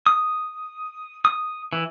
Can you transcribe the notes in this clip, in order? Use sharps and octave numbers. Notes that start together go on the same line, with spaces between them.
D#6
D#6
E3